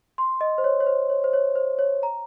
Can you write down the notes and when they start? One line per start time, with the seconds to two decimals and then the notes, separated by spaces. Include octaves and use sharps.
0.18 C6
0.41 D#5
0.58 C5
0.64 C#5
0.80 C#5
0.87 C5
1.09 C#5
1.24 C5
1.33 C#5
1.56 C5
1.79 C#5
2.03 A#5